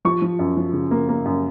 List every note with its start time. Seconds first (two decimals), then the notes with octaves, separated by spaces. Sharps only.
0.05 F3 C#6
0.22 F3
0.39 F#2
0.57 F3
0.73 C#3
0.91 A#3
1.09 A#3
1.25 F#2